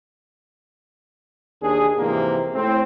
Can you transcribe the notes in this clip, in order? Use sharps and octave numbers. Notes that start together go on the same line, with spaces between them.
D#2 D4 G#4
F2 G#2 C3 E3 A#3
A2 C4